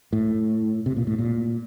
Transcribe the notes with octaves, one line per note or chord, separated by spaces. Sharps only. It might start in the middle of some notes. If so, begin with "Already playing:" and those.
A2
C3
A#2
A2
A#2